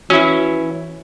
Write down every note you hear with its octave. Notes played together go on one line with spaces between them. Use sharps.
E3 C#4 E4 F#4